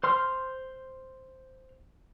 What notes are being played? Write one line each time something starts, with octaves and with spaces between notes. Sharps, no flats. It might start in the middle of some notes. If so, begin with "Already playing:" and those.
C5 C6 F6